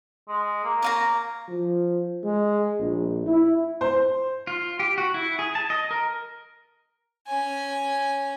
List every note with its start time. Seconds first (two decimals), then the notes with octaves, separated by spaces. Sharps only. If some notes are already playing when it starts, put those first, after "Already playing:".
0.29 G#3
0.64 A#3
0.82 C#5 F5 A#5
1.49 F3
2.24 G#3
2.80 A#1
3.27 E4
3.81 C5
4.47 F4
4.80 G4
4.98 F#4
5.14 E4
5.39 G#4
5.55 A5
5.70 D#5
5.91 A#4
7.27 C#4 G#5